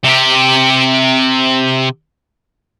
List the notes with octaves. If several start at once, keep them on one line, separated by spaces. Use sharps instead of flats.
C3 G4